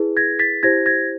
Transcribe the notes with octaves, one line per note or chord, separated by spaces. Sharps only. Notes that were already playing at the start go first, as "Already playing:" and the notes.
Already playing: E4 G#4 B4
G#6 A#6
A6 B6
E4 G4 C5 G#6 A#6
G#6 A#6